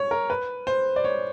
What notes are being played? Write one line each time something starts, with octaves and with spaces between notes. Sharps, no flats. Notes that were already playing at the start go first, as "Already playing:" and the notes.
Already playing: C#5
A#4
B4
C5
D5
C#5